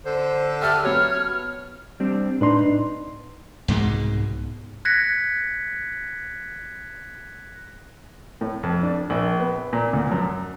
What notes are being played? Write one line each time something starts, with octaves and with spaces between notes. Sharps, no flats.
D3 C5
G4 A4 E5 A5 F6
F#3 B3 C#5
G3 C4 D4
A2 D4 D#4 B4 C6
C2 G#2 B2 G#3
F#6 G#6 A#6 B6 C#7
A2
F2
D4
A#1
B3
A#2
D2
F#2